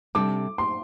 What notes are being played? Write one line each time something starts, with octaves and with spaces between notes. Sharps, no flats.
C3 G3 D4 A4 D6
C6